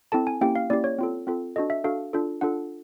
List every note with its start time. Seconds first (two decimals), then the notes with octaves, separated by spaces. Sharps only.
0.12 C4 E4 A4 A5
0.27 G#5
0.41 A#3 C#4 E4 G4 G5
0.56 F5
0.70 A#3 C#4 E4 G4 D5
0.84 C#5
0.99 C4 F4 A4
1.27 C4 F4 A4
1.56 D4 F#4 A4 D#5
1.70 E5
1.84 D4 F#4 A4 F5
2.13 D4 F4 A4
2.41 D4 F4 A4 F#5